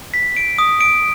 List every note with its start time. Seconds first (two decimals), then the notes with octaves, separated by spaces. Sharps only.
0.14 B6
0.37 D7
0.59 D#6
0.81 D7